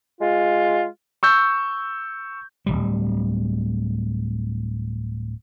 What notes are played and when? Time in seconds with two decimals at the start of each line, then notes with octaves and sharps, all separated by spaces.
0.21 G#3 F4
1.23 C#6 E6 G6
2.66 D1 G1 G3